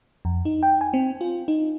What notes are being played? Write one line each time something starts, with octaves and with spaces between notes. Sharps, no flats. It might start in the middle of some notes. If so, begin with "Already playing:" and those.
F2
D#4
G5
G#5
C4
F4
D#4